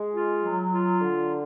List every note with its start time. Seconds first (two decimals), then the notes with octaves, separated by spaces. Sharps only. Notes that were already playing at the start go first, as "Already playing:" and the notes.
Already playing: G#3
0.14 F4
0.42 F#3
0.72 F4
1.01 D3